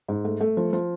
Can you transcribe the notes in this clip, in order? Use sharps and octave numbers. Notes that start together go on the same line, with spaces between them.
G#2
A3
A3
F3
F3